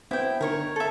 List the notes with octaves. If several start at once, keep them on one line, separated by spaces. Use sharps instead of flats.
B3 C4 E4 G5
D3 D#4 A#4 C#5 C#6
A4 E5